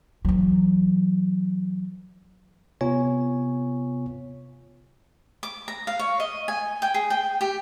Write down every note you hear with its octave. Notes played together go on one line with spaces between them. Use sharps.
E3 F#3
C3 B3 F4 C#5 G#5
D6
A#5
F5
C#5
D#5
G#5
G5
G#4
G5
G4